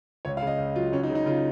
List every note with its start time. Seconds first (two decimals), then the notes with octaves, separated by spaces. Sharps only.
0.25 C#2 C#5
0.37 F5
0.42 C#3 D#5
0.58 C#2
0.76 F#3 F4
0.92 C#2 C#4
1.03 D#4
1.10 C#3
1.15 D#4
1.26 C#3 F4